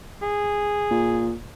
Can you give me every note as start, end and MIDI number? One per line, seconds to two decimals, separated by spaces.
0.22 1.33 68
0.91 1.34 46